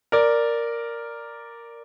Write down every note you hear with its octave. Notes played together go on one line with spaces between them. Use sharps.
A#4 D5